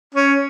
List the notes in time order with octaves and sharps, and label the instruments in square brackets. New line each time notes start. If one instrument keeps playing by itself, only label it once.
[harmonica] C#4